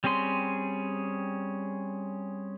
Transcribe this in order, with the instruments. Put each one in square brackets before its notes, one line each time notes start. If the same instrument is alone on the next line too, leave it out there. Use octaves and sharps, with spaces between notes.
[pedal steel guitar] G3 C4 C#4 G#4 C6